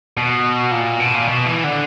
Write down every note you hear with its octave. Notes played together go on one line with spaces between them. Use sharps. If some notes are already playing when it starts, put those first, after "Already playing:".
B2
A#2
B2
A#2
B2
E3
D3